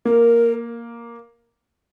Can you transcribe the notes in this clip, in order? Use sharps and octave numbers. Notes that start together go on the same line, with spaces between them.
A#3 A#4